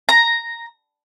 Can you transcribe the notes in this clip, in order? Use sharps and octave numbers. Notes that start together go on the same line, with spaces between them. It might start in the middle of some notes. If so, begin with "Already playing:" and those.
A#5